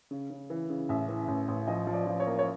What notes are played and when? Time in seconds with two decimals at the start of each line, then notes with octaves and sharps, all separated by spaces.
0.11 C#3
0.30 C#3
0.50 E3
0.69 C#3
0.89 A1 E5
1.08 E3
1.28 A1
1.48 A1
1.67 F3 D#5
1.87 F3
1.93 D5
2.07 F3
2.20 C#5
2.27 A#3
2.39 C#5